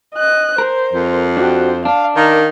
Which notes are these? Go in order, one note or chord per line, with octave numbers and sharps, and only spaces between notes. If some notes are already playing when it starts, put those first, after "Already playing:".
D#5 F#6
A#4 C5
F2
D4 F#4 G4 C5
D4 F5
D#3 A#4 F5